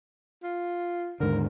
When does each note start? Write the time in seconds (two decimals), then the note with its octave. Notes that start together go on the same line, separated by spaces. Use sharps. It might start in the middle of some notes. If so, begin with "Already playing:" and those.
0.43 F4
1.20 D#2 G#2 D3 A#4